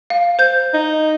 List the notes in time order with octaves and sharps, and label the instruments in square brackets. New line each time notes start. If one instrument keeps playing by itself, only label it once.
[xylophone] F5
C5 G6
[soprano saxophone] D#4